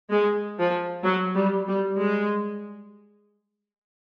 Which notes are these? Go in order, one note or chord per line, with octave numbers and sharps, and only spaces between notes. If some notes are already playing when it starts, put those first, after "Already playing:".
G#3
F3
F#3
G3
G3
G#3